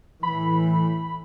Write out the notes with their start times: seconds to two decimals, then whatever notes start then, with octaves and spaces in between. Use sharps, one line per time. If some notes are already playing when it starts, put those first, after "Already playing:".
0.23 A2 E3 B5